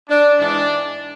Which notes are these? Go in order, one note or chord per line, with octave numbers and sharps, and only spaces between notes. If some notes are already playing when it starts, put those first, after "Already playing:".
D4
G#2 E3 G#3 D4